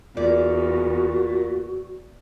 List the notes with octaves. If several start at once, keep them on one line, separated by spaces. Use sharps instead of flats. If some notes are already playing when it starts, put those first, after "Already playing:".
E2 A#2 F#4 D5